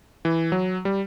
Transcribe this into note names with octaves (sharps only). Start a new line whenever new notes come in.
E3
F#3
G3